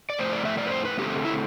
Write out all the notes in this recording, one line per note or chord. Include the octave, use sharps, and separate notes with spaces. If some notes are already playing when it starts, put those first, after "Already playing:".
D5
A2 F3 A3 C4 C5
D5
E5
D5
B4
C5
B4
D3 A3 C4 G4
E4